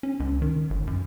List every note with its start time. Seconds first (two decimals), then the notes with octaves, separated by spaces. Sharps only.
0.03 C#4
0.20 C#2
0.42 D#3
0.70 G1
0.87 F#2